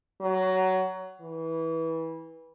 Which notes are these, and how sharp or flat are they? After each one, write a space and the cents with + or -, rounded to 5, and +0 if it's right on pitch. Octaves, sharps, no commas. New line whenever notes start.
F#3 +15
E3 -20